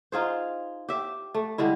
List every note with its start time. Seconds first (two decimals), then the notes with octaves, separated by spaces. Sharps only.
0.12 D#4 F4 G#4 C5
0.89 G4 E5
1.34 A3
1.58 D3 G3 G#3 E4